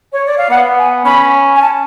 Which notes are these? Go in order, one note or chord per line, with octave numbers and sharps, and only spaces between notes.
C#5
D5
F5
B3 F#5
G#5
C#4 B5
G#5
A5